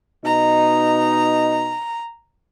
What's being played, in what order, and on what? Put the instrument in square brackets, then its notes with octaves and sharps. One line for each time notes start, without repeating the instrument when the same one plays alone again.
[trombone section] B2 D#4 [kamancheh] A#5